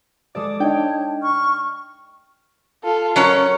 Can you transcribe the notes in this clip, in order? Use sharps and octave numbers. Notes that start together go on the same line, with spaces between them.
G#3 A4 D5 D6 D#6
D4 D#4 C#5 D#5 G5 A5
C#6 F6
F4 A4
F#3 C#4 A#4 C#5